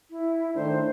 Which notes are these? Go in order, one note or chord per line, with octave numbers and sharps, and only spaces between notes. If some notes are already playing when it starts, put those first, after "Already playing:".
E4
A2 D#3 D4 C5